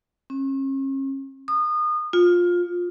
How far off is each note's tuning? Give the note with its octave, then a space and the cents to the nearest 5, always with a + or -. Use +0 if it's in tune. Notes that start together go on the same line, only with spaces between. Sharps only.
C#4 -40
D#6 -30
F4 +15